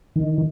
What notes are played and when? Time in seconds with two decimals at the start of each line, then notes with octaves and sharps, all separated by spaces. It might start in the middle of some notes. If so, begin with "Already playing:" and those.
0.16 D#3